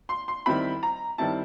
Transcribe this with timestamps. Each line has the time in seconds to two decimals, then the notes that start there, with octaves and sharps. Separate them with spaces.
0.09 C6
0.28 C6
0.46 D#3 G3 C4 E4 B5
0.83 A#5
1.18 D#3 G3 C4 E4 A5